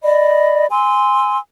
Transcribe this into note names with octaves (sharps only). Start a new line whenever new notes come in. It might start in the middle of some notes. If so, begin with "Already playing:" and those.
D5 D#5 B5
G#5 C6 E6